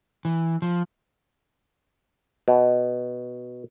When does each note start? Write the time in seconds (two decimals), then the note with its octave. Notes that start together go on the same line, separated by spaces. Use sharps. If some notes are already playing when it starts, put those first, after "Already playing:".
0.25 E3
0.62 F3
2.48 B2